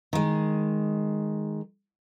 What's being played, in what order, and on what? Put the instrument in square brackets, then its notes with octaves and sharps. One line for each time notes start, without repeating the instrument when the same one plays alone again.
[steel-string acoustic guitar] D#3 G#3